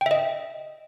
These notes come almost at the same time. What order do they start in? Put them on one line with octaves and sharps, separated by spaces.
G5 E5 D#5